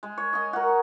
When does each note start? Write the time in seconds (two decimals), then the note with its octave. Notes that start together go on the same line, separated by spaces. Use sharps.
0.03 G#3
0.18 C#5
0.33 D#5 G#5
0.53 F#4 A#4